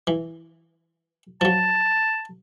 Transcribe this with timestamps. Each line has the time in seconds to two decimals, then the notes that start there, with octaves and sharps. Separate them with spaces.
0.07 E3
1.41 F3 F#3 A5